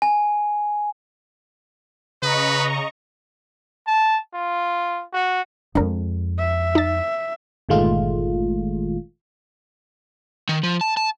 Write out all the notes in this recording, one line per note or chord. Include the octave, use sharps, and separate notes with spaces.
G#5
C#3 B4 D#5 A#5 C#6
A5
F4
F#4
F2 G#3 D4 A#4
E5
D#4 A6
G1 A#2 D#3 G#3 A3 F4
D#3
F3
A5
A5